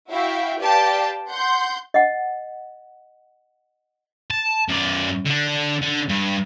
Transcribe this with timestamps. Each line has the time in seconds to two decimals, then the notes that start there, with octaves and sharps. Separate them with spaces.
0.10 E4 F#4 E5 F5 G5
0.62 G4 B4 D5 F5 G5 A5
1.30 F#5 C6 G6
1.94 D#5 F#5
4.30 A5
4.69 F#2 D5
5.26 D3 D4
5.82 D3
6.09 G2